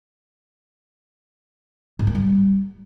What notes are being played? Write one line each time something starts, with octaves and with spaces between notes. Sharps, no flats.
G#2
A#3
G3